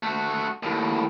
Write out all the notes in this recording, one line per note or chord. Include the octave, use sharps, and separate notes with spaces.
A3 F#4
D#2 A2